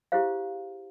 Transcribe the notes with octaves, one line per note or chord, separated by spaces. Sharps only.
E4 G4 G#4 C5 F5